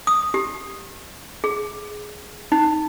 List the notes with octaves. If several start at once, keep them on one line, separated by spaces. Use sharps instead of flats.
D#6
G4
G#4
D#4